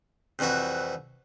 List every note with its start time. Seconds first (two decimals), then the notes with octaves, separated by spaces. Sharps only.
0.39 C2 F2 E3 F#4 E5